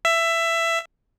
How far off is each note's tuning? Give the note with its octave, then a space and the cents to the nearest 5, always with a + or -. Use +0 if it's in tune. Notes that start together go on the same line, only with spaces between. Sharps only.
E5 +15